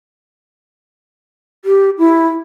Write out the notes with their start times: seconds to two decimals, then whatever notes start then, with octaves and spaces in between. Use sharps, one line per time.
1.65 G4
1.98 E4